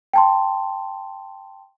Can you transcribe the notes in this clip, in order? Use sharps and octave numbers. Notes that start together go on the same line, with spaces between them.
G5 A5 C6